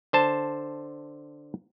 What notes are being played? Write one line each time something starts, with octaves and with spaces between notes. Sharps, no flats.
D3 C5 A5